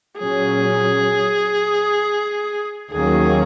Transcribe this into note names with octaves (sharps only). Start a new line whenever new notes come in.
A#2 F#3 C#4 G#4
D#2 D#3 F#3 A#3 C#4 G#4